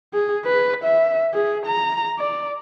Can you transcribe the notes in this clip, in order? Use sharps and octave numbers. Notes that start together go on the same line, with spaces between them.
G#4
B4
E5
G#4
A#5
D5